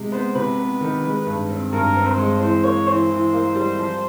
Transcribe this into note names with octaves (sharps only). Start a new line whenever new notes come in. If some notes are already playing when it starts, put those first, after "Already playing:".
Already playing: C3 G#3
B3 C5
C3 B4
B3
D#3
G#3
G2
C4
G2 A#4
C4
C5
G#3
E3 C5
A#3 C#5
E3 C5
E3
A#3
G3
F3